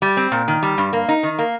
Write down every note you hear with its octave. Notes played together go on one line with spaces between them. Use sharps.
G3
C4
A#2
D#3
G3
G2
A#3
D#4
D#3
A#3